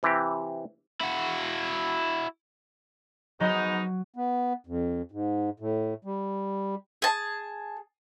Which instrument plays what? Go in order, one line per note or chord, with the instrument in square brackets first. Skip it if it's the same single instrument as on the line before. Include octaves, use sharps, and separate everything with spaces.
[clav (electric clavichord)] C3 E3 C4 G4
[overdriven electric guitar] E4 F#4
[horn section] G#2 B3 D#4 [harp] F#3 F#4
[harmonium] B3
F2
G#2
A2
G3
[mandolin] G#4 A5